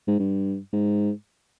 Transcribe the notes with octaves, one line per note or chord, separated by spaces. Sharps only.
G#2
G2
G#2